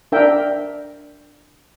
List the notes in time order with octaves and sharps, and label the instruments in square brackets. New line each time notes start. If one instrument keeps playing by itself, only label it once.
[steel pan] D4 A#4 E5 G5